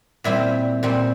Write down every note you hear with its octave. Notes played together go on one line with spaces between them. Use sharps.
A#2 G3 C4 E4
A#2 G3 C4